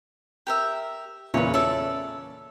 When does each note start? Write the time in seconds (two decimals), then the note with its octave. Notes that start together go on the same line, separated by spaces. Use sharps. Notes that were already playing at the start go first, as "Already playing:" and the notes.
0.47 G4 A#4 E5
1.34 E2 A#2 C#3 B4 C#5
1.54 C#4 A4 D5 E5